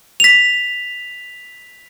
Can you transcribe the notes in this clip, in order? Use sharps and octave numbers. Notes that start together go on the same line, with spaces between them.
B6 F7